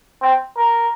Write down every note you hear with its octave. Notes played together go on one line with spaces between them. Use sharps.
C4
A#4